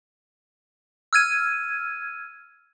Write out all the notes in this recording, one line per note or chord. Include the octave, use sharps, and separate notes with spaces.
E6 F6 G#6 D#7